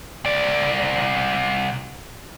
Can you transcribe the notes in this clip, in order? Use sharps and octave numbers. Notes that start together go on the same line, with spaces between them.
C2 D5